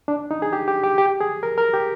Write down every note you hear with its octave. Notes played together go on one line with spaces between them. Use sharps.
D4
D#4
G#4
G4
G4
G4
G4
G#4
A#4
A#4
G4